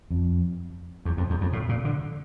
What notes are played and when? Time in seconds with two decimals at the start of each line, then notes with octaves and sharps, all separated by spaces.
0.11 F2
1.05 E2
1.17 F2
1.30 E2
1.41 F2
1.53 A2
1.69 A#2
1.85 D3